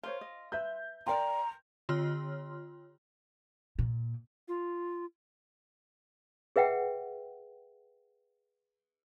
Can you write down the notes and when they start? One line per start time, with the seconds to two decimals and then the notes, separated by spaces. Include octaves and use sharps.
0.03 F4 A#4 C5 C#5
0.21 D#5
0.52 B4 E5 G6
1.07 F4 A#4 D5 G5 A#5 C6
1.89 D3 F4 C#5 C6 F6
3.79 A#2
4.48 F4
6.56 G#4 B4 E5 F#5 G5